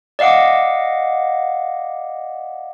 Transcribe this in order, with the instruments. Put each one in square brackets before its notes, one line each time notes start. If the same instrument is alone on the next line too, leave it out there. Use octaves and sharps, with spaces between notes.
[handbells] D5 D#5 F5 F#5 D6